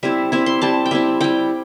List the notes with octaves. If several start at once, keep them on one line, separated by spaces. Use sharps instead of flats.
G3 C4 E4 E5
G3 C4 E4 E5
C6
G3 C4 E4 A5
G5
G3 C4 E4 E5
G3 E4 G5